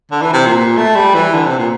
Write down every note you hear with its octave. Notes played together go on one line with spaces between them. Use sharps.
D3
E3
C3
A#2
A#2
A3
G3
E3
D3
C3
A#2